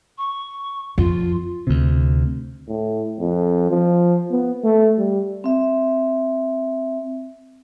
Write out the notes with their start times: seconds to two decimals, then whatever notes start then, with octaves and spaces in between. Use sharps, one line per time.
0.18 C#6
0.98 F2 F4
1.67 D2 C3
2.68 A2
3.20 F2
3.71 F3
4.31 B3
4.64 A3
4.98 G3
5.44 C4 E5